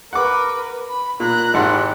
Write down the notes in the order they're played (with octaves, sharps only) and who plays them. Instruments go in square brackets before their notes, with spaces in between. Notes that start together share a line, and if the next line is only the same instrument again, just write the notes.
[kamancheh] A#4 B4 [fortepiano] F#5 D6
[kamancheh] B5
[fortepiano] A#2 [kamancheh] A#5 F#6
[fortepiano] G#1 F#5 C6 [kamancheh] E4 G4